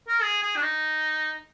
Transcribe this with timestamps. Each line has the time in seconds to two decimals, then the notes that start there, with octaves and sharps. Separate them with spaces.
0.08 A#4
0.22 G#4
0.43 G#4
0.56 D4
0.63 D#4